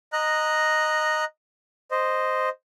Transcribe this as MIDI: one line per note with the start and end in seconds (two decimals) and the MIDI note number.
0.13 1.24 75
0.13 1.24 82
0.13 1.24 90
1.91 2.49 72
1.91 2.49 75